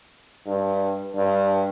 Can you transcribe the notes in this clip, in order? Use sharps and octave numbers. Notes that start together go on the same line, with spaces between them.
G2
G2